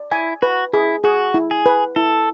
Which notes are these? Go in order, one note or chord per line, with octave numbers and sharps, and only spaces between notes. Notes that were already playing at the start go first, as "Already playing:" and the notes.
Already playing: D5
E4 G#5
F#4 B4
E4 G#4
F#4 G#4
E4
G#4
B4
E4 A4